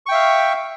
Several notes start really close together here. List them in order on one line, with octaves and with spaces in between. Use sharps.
C#6 G5 E5 F5